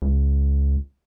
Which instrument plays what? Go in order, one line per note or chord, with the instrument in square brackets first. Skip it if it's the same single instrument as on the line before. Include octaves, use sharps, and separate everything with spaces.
[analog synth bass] C#2